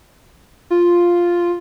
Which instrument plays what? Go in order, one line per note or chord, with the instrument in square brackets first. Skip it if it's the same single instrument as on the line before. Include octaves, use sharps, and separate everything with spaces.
[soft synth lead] F4